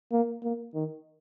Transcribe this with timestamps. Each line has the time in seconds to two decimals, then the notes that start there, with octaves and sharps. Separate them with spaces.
0.12 A#3
0.43 A#3
0.75 D#3